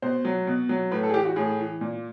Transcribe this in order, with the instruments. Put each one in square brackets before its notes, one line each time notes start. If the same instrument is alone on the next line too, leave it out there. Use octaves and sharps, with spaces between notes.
[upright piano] B2 C5
F#3
B2
F#3
A2 B4
A4
G#4
E3 G4
F#4
A2 G#4
E3
A#2